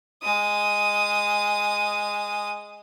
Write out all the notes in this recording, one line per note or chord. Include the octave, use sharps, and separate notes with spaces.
G#3 D#6